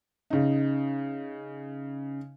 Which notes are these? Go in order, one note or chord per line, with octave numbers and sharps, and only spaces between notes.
C#3 D#4